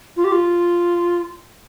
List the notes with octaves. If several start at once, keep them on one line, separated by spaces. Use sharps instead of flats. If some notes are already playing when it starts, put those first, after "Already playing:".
F4
G4
F4